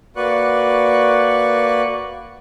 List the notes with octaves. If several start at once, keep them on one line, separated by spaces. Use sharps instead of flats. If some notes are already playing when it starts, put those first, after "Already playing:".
A#3 F#4 B4 D5 C#6 F#6